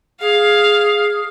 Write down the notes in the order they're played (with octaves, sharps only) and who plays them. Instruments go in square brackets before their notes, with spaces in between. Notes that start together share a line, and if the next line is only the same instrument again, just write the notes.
[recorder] G#4 [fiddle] F5